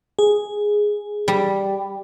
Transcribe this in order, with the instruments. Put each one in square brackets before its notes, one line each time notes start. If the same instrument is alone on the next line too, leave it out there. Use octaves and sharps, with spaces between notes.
[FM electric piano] G#4
[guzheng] G3